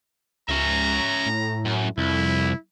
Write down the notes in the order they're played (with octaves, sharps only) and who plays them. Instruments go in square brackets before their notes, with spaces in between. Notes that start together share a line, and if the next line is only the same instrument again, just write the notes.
[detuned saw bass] C#2 [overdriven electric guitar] C#4 E5 [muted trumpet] A#5
[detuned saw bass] A2
[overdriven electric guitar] F#2
[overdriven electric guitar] C2 [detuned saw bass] F2 [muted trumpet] E4